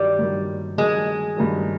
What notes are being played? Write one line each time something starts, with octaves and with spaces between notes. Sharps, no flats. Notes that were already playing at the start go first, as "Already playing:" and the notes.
Already playing: G2 D#3 F#3 G3
G2 D#3 F#3
G2 D#3 F#3 G#3
G2 D#3 F#3